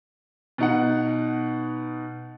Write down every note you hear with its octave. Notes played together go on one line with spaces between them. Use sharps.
B2 D#4 F#5